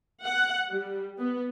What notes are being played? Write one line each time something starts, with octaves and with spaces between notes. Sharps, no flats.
F#5
G3
B3